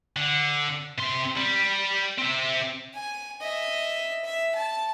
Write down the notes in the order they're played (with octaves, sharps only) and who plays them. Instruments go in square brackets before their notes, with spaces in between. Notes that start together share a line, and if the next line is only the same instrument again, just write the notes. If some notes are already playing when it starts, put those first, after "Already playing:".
[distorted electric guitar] D3
C3 C6
G3
C4 E5
[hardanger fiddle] G#5
D#5 E5
E5
A5